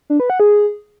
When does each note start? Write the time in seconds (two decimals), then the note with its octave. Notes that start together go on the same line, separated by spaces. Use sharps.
0.10 D4
0.20 B4
0.30 F#5
0.40 G#4